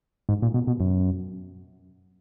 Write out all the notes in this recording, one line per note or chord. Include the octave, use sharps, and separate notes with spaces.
G#2
A#2
B2
B2
F#2